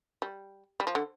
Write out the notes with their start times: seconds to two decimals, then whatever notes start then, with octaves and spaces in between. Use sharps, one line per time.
0.22 G3
0.80 G3
0.87 F3
0.95 D3